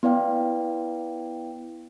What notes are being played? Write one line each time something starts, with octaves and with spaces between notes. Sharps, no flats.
B3 E4 B4 D5 F5 G5